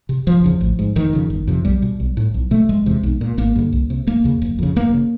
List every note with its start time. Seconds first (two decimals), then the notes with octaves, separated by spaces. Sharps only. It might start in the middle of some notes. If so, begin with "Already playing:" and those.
0.09 C3
0.27 F#1 F3
0.44 E2 C#3
0.61 A1
0.79 G#2
0.96 F1 D#3
1.13 F2 C#3
1.30 G1
1.47 F2 C3
1.65 B1 G3
1.82 B2
2.00 B1
2.17 A2
2.34 B1
2.51 B2 A3
2.69 F#1 G#3
2.86 E2 C3
3.03 B1
3.21 A#2
3.38 G#1 A#3
3.55 G2 D3
3.72 C2
3.90 C3
4.07 E1 A#3
4.24 D#2 C#3
4.42 F#1
4.59 F2 C#3
4.76 F#1 A#3
4.94 C#3